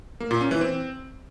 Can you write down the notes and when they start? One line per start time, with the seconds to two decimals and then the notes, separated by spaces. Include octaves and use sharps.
0.20 A#3
0.31 A#2
0.41 C#4
0.51 E3
0.61 C4